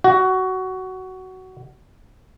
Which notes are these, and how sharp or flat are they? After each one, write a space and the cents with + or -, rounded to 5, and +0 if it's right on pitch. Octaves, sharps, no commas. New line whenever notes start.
F#4 +15